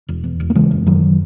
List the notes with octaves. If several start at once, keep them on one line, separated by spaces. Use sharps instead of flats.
E1
E2
E1
A#3
C#3 E3 G#3
F#1
F#2 D#3 F#3